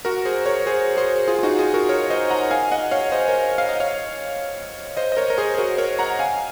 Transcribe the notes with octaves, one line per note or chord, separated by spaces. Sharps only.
F#4 A#4
G#4 C5
A#4 C#5
G#4 C5
G#4 C5
F4 G#4
F4
D#4 F#4
F4 G#4
F#4 A#4
A#4 C#5
C5 D#5
F#5 A#5
F5 G#5
D#5 F#5
C#5 F5
C5 D#5
A#4 C#5
F5
D#5
C#5 F5
C5 D#5
D#5
A#4 C#5
A#4
G#4 C5
G#4
F#4 A#4
A#4 C#5
F#5 A#5
F5 G#5